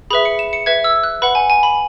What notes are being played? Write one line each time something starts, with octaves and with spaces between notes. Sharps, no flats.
G#4 B4 E5 B5
C#7
E7
C#7
B4 E5 G#6
E6
F#6
B4 F#5 B5
G#5
G#5
B5